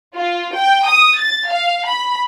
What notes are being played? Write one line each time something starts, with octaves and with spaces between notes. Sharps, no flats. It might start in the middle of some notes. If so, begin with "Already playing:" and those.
F4
G5
D#6
A6
F5
B5